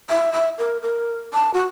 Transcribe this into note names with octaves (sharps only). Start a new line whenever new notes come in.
E5
E5
A#4
A#4
A5
F#4